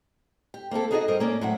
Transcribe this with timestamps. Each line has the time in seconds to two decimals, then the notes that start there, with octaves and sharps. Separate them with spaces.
0.54 G4
0.71 A#3 C4 E4 A4
0.91 D#4 F#4 G#4 A4 D5 D#5
1.08 G2 A#4 C5 D#5
1.20 A#3 C#4 D5
1.41 A2 C3 F#3 E5 F#5